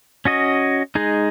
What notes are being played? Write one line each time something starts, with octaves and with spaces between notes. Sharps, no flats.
C#4 F#4 D#5
G#3 D#4 G#4